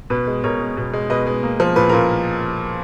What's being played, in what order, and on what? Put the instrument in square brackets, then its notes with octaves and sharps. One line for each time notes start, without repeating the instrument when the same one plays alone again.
[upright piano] B2 B4
G#3
B2 A#4 C#5
G#3
B2
G#3
B2 B4 D#5
G#3
A#3
F3
A#2 B4
A#2 A#4